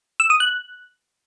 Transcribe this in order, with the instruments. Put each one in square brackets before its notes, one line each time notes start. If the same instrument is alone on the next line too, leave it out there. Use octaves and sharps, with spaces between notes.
[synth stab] E6
D#6
F#6